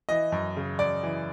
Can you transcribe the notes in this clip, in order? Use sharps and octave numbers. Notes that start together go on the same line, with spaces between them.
E3 D#5
F#2
C#3
F#2 D5
E3